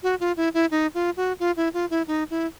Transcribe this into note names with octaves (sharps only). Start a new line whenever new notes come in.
F#4
F4
E4
E4
D#4
F4
F#4
F4
E4
F4
E4
D#4
E4